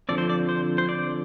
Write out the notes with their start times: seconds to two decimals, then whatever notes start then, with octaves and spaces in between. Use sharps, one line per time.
0.09 D3 F3 C4 D5
0.18 C5
0.30 D5
0.49 C5
0.78 C5
0.89 D5